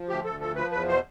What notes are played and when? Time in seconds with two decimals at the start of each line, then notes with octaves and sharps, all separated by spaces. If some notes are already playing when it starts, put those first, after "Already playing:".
Already playing: F3
0.09 D2 G4
0.25 D2 A4
0.40 F3 A4
0.56 F3 B4
0.72 E2 B4
0.88 B2 C5